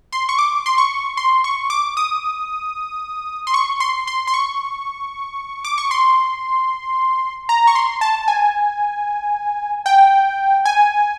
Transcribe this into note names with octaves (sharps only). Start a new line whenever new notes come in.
C6
C#6
D6
C6
C#6
C6
C#6
D6
D#6
C6
C#6
C6
C6
C6
C#6
D6
C#6
C6
A#5
C#6
C6
A5
G#5
G5
G#5